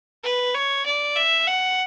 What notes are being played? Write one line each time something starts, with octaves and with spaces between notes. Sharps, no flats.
B4
C#5
D5
E5
F#5